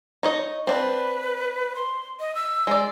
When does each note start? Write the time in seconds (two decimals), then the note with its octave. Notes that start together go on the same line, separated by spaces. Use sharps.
0.23 D#4 C#5 D#5
0.67 C4 D4 B4
1.76 C6
2.20 D#5
2.35 E6
2.67 G#3 D5